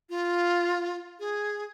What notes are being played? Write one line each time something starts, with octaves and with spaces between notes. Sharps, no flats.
F4
G#4